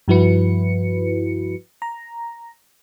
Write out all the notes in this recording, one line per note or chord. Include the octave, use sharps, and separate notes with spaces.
G2 F3 E4 F#4 B4 C#7
A#5